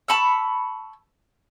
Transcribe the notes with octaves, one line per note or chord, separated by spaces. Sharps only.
A5 B5 C#6 E6